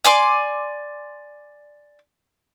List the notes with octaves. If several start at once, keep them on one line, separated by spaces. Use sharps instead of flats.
D5 G#5 C6 D6